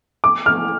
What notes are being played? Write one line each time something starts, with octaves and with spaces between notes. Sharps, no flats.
D6
F6